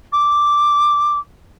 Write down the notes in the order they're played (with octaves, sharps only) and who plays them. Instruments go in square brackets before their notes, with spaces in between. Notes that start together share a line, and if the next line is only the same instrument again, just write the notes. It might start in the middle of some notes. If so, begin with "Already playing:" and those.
[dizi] D6